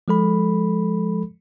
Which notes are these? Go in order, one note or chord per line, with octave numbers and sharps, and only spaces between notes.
F3 G#3 A4 B5